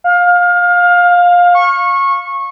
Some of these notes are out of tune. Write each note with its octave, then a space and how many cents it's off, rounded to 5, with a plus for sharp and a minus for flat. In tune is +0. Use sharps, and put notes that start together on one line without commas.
F5 +20
C#6 -20